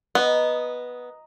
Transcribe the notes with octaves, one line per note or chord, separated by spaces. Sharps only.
B3 D#5 A#5